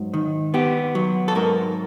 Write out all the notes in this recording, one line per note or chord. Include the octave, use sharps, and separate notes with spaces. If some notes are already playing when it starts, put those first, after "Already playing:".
Already playing: G#2 F#3
D#3
B3 G4
F#3
A4
G#2 A#4